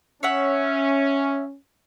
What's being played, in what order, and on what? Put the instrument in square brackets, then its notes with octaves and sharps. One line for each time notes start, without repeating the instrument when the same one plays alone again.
[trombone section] C#4 [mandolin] C#5 E5 F#5